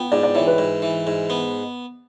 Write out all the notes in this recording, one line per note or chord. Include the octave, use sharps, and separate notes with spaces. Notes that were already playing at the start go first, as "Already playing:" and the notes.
Already playing: B3 G5
G#2 D5
D5
E3 C#5
B4
G#2
E3
G#2
B3